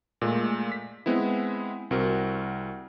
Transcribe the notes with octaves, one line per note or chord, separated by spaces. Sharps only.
A#2 G#3 A3
B6
G#3 B3 C4 E4
C2 C4 F#4 A#4